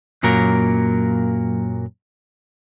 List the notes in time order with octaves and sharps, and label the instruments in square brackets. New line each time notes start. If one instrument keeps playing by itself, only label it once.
[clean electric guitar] F#2 A#2 F#3 A#3 A#4